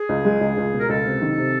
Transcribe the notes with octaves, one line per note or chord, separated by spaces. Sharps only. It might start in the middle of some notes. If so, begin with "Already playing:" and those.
Already playing: G#4
C#2
G#3
C#2
C#2
B2
A#4
C#2 A4
C3
D#3
C3